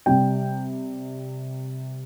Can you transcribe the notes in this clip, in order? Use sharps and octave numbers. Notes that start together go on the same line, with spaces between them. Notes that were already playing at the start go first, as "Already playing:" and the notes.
C3 G3 G5